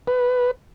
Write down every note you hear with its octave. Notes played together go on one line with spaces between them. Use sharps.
B4